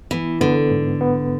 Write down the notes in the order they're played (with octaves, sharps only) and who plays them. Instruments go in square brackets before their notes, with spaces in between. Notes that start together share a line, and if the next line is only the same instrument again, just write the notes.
[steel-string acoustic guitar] E3 [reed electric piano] B3
[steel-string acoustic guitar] D3 [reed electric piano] B3
[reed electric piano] G#2
B3